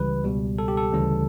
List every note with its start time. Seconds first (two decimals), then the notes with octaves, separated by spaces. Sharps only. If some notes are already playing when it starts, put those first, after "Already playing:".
Already playing: C#2 C#3 E3 G3 B4
0.24 C#2 B2 G3
0.59 A4
0.68 G4
0.77 A4
0.92 D2 C#3 E3 G3 C#4